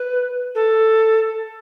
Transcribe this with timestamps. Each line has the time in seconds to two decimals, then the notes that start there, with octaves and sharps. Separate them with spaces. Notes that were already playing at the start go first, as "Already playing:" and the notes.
Already playing: B4
0.55 A4